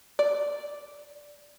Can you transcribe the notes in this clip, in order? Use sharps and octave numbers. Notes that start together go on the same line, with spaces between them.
D5